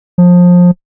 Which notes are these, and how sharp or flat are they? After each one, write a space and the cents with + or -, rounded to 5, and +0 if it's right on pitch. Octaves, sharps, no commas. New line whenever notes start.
F3 +25